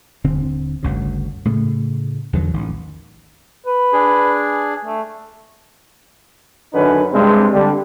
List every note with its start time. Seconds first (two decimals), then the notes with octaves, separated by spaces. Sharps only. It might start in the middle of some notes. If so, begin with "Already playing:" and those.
0.24 D#1 D3 C4
0.83 G1 D2 C#3
1.45 A2 C#3 A3
2.33 E2 D3 D#3 F#3
2.54 A1 D#3
3.66 B4
3.93 D4 G#4
4.85 A3
6.73 F#2 D3 D#3 C#4 D#4 B4
7.13 G2 C3 G#3 C4
7.53 D3 G3